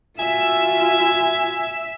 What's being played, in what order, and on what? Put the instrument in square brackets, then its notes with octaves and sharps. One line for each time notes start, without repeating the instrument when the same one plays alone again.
[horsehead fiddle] F4 F#4 [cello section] E5 [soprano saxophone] G#5